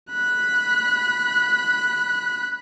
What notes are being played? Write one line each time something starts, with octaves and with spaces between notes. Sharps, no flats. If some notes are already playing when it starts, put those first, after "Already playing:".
B5 F#6